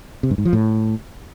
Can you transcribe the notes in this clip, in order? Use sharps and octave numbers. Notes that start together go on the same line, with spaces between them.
C3
G2
G#2
F3
A2